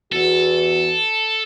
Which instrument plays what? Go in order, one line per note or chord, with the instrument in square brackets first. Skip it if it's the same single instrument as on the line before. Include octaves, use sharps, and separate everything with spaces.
[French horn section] E2 F#4 [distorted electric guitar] A4